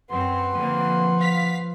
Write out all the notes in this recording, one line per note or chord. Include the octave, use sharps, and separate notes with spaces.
F#2 C4 B4 F#5 C6
D3 F3 A#3 C4
F5 B6